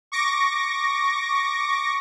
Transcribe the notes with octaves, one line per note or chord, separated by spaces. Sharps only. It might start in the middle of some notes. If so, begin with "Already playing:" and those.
C#6 D6 A#6